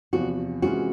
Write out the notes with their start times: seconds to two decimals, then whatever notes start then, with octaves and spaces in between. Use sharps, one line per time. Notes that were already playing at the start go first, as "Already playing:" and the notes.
0.13 E2 C3 F3 F#4
0.62 C3 E3 G#3 C#4 F4 F#4